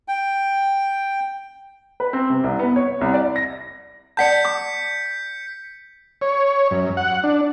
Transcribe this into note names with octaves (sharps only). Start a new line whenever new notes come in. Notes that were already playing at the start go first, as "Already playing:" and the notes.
G5
B4
C4
C3
C2
B3
C#5
C2
D5
A#6
D5 F#5 A5 G6 B6 C#7
D6
C#5
F#2
F#5
D4